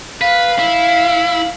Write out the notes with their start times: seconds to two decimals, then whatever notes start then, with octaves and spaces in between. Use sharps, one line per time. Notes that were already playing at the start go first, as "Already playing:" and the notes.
0.21 B4 F5
0.59 E4